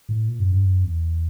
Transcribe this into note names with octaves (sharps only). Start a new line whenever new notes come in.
A2
A#2
F#2
G2
F#2
E2